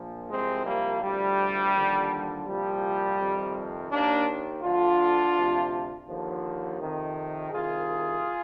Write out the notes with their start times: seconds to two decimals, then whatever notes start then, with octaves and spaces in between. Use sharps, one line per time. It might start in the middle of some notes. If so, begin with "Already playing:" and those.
Already playing: A#1 A#2 F3
0.29 C2 C3 F3 G#3 C4
0.65 G3 A#3
1.01 D2 C3 F3 G3
1.74 D#2 D3 F3
2.46 C2 A#2 F3 G3
3.19 F2 C3 D#3
3.91 D#2 D#3 A#3 D4
4.63 D2 D3 F3 D4 F4
5.35 D2 C3 F3
6.07 D#2 D3 F3
6.79 F2 C3 D#3
7.51 C2 C3 D#3 F4 G#4